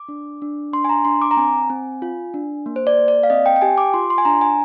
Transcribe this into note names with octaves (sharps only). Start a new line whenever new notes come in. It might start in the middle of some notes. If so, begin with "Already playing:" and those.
Already playing: D6
D4
D4
D4 C6
G#5
A#5
D4 C6
D6
A#5
C4 G#5
C4
F4
D4
A#3
C5
D5
A#3
D5
F5
C4 D#5
G5
G5
G4 G#5
D6
F4 C6
C6
G#5
D4 A#5
G#5